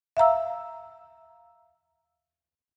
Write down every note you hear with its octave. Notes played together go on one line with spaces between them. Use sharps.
E5 F5 A#5 E6